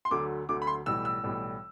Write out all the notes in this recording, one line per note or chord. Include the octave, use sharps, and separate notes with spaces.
C6
D2 D3 F#3 A3 D6
D2 D3 F#3 A3 D6
B5
C6
B1 A2 E3 G3 E6
E6
B1 A2 E3 G3